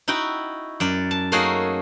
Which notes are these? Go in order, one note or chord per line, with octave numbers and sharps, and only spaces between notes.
D#4 E4 F#4 G5
F#2 D5
A5
A3 A#3 C#4 D#4 F#4 G#4